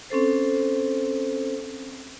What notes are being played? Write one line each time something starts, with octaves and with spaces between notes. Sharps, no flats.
C4 C#4 A4 C5